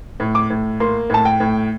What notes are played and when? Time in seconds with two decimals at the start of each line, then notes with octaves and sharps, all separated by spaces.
0.20 A2
0.35 D6
0.50 A2
0.80 A#3 C6
1.10 A2 A5
1.25 G5
1.40 A2